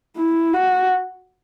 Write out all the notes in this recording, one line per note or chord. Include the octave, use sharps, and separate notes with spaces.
E4
F#4